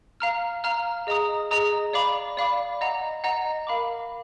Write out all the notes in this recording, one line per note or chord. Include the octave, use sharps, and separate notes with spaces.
F5 A#5 F6
F5 A#5 F6
G#4 D#5 A#5 D#6
G#4 D#5 A#5 D#6
D5 F5 B5 D6
D5 F5 B5 D6
D#5 F#5 A#5
D#5 F#5 A#5
A#4 F5 B5 D6